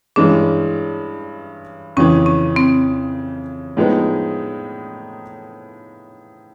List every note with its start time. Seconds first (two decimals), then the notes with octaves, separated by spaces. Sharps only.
0.16 G2 E3 G#3 C#4 D4
1.97 F2 C#3 E3 C#4
2.26 C#4
2.56 C4
3.77 A2 F3 G#3 B3 D#4